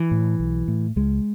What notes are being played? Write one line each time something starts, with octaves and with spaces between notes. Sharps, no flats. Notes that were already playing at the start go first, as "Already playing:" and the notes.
Already playing: E3
A2
B1
A2
C#2 G#3